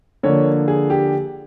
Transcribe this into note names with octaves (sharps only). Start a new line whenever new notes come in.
D3 F3 A#3 C#5
G#4
G4